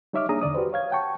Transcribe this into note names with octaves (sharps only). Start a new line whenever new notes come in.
G3 D#4 C#5 E5 D6 F6
A#3 D4 G#4 A#5 D#6
E2 D3 D5 D#6
F#4 G4 B4 C5
C#5 F5 G#6
F#5 G5 A5 C#6